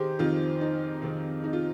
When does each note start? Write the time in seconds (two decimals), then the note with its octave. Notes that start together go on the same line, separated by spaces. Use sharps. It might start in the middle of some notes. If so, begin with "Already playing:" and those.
Already playing: D#3 G4 G#4 C5
0.19 F2 D#3 F4
0.61 D#4
1.02 F2 D#3 C4
1.44 D#4
1.53 F4